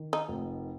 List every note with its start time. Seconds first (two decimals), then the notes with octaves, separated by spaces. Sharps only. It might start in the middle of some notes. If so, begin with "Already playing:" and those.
Already playing: D#3
0.13 D#4
0.28 F1